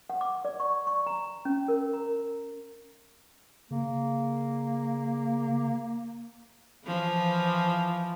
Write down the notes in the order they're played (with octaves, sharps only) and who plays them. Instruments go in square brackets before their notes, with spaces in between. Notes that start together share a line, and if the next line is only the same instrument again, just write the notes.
[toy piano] F#5
D6
D5
C#6
C#6
A#5
C#4
A#4
A#5
[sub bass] C#3 [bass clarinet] A#3
[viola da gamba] E3 F3